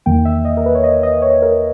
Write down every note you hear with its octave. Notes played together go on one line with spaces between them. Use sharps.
E2 D#3 A#3 G5
E5
D#5
A#4
B4
C#5
D#5
D#5
C#5
A#4